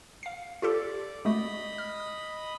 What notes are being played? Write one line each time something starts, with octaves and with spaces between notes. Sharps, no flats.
F5 C7
F4 G4 A4 D5
G#3 A3 F#4 D#5 B5 D#6
F6